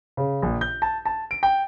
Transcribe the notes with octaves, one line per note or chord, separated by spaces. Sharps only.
C#3
A#1
G6
A5
A5
D7
G5